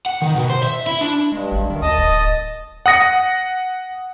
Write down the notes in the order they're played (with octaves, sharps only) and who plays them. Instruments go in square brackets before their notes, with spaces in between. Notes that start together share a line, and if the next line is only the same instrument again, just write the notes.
[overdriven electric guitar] F#5
D#3
B2
C5
E5
E4
D4
[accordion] G2 [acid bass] G#3
[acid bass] G#1
[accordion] F#2 [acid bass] D#3
[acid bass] D2 [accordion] D#5 A5 D#6
[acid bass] D1
[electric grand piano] F#5 D#6 A#6 C#7